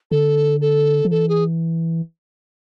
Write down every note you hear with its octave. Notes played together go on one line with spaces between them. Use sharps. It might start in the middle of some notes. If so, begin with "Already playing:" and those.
D3 A4
A4
F3
E3 A4
G#4